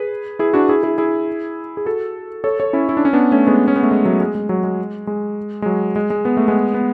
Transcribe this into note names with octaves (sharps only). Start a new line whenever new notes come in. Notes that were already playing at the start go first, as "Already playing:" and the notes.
Already playing: G#4 B4
E4 G#4
D4 F#4
E4 G#4
E4 G#4
E4 G#4
G#4
F#4 A4
A4 C#5
A4 C#5
C#4 E4
E4
D4
C#4
B3 D4
A3 C#4
G#3 B3
C#4
B3
A3
G#3
F#3 A3
G#3
G#3
F#3
G#3
G#3
G#3
F#3
G#3
G#3
B3
A3
G#3 B3
B3